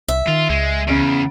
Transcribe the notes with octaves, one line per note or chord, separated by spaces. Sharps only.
C2 E5
D#3 F4
C#2 G#3
E2 C#3 D7